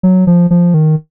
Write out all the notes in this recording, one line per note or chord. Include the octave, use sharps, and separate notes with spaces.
F#3
F3
F3
D#3